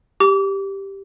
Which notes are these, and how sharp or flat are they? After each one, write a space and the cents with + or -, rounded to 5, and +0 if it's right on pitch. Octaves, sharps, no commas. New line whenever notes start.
G4 +0 D6 -30